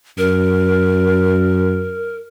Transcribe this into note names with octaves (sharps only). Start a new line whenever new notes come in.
F#2 A#4